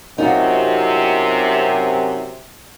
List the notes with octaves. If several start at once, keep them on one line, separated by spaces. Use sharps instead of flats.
F#2 C3 D#4 F4 F#4